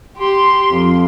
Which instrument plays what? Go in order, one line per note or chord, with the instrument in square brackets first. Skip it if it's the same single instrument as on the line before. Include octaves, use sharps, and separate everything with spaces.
[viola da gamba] G4 [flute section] C6
[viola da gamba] F2